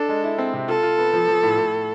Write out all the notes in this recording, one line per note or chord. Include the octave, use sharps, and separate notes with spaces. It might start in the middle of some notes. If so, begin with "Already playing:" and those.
Already playing: D4 A4
G#3
E4
C4
C3
F4 A4
F4
B3
F3
F3
A2
A2